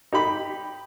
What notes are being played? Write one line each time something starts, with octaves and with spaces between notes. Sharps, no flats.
D#4 G4 B5